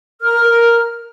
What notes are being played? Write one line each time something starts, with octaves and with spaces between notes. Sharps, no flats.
A#4 F6
A#4